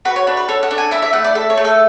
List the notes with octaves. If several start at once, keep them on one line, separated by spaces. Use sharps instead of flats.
F#4 B4
C#5
D4 B4
B4
A4 C#5
F#5
D4
G#5
E4 E5
E5
A3 F#5
D5
A4 E5
C#5
A3
A4